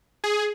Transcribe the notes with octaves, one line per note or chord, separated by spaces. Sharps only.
G#4